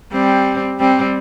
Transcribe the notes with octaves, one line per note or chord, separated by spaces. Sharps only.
G3 C4
G3 C4